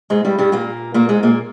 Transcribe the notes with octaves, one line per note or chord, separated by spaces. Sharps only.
G#2 G#3
G2 G3
G2 G3
A#2 A#3
A#2 A#3
G#2 G#3
A#2 A#3